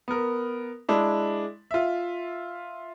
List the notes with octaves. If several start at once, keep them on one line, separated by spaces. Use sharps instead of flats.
B3 A#4
G#3 D4 E4
F4 E5